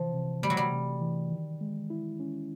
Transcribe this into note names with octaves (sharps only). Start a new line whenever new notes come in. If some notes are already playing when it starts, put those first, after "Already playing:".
Already playing: C3 E3 F3
C3
G3 A3
F#3
G3
C3
E3
D#3
G#3
E4
C#4